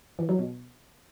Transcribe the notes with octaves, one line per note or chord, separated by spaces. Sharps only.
E3
F#3
B2